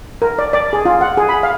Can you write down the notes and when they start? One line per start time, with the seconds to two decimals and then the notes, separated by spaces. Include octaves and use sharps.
0.22 A#4
0.39 D5
0.53 D5
0.73 G#4
0.85 F4
1.01 F#5
1.17 G#4
1.29 B5
1.43 F5